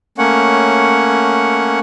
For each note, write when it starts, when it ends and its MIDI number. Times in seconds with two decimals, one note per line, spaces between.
0.18 1.79 57
0.18 1.79 58
0.18 1.79 61
0.18 1.79 73
0.18 1.79 78